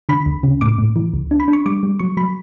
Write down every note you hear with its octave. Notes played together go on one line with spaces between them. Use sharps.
D3 B5
D2
C#3
A2 D6
A2
E3
C#2
D4
B5
D4
C#6
G3 D6
G3
F#3 C#6
F#3 B5